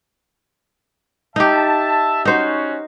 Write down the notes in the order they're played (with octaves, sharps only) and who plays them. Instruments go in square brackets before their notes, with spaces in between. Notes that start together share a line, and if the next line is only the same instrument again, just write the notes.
[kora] D#4 G4 [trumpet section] E5 A5
[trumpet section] C#4 F#4 [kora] D#4 C5